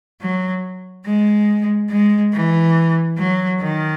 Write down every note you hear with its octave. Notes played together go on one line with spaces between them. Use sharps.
F#3
G#3
G#3
E3
F#3
D#3